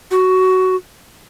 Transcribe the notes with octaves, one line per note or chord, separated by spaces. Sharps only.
F#4